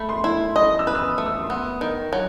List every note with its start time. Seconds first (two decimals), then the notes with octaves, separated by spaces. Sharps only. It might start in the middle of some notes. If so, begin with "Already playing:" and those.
Already playing: A3 B5
0.09 C6
0.24 E4
0.56 D#5 D#6
0.79 E6
0.87 B4
0.95 E6
1.03 D#6
1.18 A3
1.26 E6
1.43 C6
1.50 B3 D#6
1.81 D#3
2.13 F#3